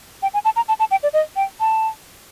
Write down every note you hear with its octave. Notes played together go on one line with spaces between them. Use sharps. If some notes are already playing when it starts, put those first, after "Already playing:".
G5
G#5
A5
A#5
A5
A5
G5
D5
D#5
G5
A5